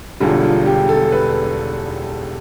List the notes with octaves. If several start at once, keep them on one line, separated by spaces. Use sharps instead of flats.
E1 E2 D3 G3 F4
F4
G4
A4
B4